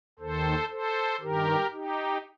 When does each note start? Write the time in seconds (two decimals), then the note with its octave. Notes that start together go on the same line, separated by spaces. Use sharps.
0.19 D#2 D#3 A4 C5
0.70 A4 C5
1.20 G2 D#3 G4 A#4
1.72 D#4 G4